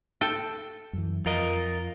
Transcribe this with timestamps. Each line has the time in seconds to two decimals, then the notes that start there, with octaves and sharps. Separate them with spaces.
0.21 A4 G5
0.93 F#2 E3
1.26 F2 F4 A#4 D#5